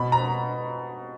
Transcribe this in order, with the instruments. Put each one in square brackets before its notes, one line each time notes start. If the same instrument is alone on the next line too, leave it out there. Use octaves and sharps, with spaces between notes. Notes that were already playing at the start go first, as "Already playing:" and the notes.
Already playing: [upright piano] B2 B5
A#5